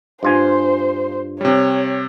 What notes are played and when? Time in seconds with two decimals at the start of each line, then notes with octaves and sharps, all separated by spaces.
0.23 G2 F4 C5 G#5
1.41 C3 G3 C#5